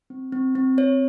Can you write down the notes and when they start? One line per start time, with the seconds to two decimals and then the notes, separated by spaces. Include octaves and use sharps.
0.10 C4
0.32 C4
0.55 C4
0.78 C4 C#5